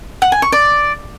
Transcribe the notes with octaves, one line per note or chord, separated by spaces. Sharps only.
F#5
G#5
C#6
D5